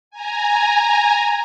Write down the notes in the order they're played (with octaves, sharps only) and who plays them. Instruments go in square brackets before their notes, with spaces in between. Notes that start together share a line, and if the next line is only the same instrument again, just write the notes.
[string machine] G#5 A#5